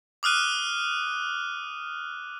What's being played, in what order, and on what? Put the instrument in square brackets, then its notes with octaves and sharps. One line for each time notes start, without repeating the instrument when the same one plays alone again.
[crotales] D6 D#6 F6 F#6 D#7